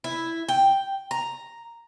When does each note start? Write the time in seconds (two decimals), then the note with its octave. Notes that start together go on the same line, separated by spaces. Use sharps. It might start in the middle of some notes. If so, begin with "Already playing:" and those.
0.04 E4
0.48 G5
1.11 A#5